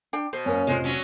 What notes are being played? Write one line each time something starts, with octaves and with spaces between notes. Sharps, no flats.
D4 G5
B2 C5
F#2 A#3 C#4
F1 G#3 F4 C5 D#5
F#3 C#4